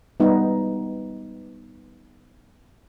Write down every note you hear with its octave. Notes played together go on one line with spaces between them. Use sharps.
G3 B3 D#4